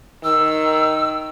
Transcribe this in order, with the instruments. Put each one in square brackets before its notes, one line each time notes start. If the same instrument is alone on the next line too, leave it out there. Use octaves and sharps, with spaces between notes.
[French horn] D#3 [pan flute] E6